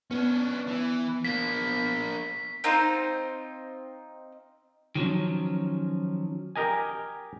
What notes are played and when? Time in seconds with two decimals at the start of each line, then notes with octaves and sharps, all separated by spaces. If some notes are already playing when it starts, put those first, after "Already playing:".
0.11 B3 C#4 D4
0.67 E3
1.25 A#3 D4 B6
2.64 C4 D#4 F4 C5
4.95 D#3 F3 F#3 C#4
6.56 G4 A#4 D#5 G#5